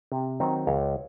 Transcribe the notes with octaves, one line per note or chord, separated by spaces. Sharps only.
C3
D#3 F#3 C4 D#4
C#2 C#5